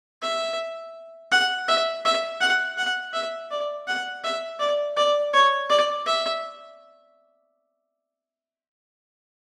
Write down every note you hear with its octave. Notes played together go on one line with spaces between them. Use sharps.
E5
F#5
E5
E5
F#5
F#5
E5
D5
F#5
E5
D5
D5
C#5
D5
E5